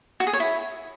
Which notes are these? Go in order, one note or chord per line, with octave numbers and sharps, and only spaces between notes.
F#4
G#4
C#5
E4